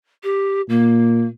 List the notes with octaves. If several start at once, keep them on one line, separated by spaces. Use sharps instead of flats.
G4
A#2 A#3